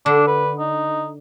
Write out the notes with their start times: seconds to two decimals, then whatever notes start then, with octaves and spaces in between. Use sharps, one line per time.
0.06 D3 D4
0.28 B4
0.59 D#4